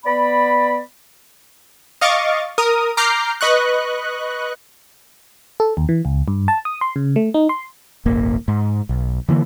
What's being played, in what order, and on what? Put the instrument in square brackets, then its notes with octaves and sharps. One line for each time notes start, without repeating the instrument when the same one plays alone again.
[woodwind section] B3 D5 B5
[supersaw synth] D#5 F5 C#6 D6 A6
A#4 D#6
A#5 D6 F6 G6 C7
B4 D#5 C#6 F#6
[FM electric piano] A4
D#2
E3
C#2
G2
A5
D#6
C6
C#3
A3
D#4
C6
[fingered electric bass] D#1 G#1 A#3
G#2
B1
D3 E3 A#3